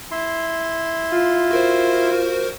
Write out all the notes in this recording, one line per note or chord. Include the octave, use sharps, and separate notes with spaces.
E4 C6
F4
F#4 A#4 C5